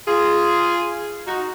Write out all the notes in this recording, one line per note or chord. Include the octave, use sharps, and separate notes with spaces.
F4 G#4
D#4 F#4